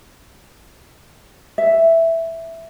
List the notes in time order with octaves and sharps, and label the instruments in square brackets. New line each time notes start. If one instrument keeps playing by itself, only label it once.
[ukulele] E5